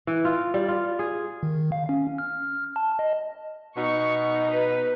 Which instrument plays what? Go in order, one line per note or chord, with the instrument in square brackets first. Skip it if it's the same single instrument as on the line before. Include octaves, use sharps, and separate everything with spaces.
[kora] E3
F4
G3
F4
G#4
[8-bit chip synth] D#3
F5
C#4
F6
A5
D#5
[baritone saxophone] B2 [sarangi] D#4 [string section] C#6 C#7
[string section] B4